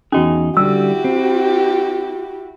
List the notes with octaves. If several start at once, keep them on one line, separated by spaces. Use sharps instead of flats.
E2 C#4 D#4 F#4 G#4
D3 G3 E4 F#4 G4 E6
C4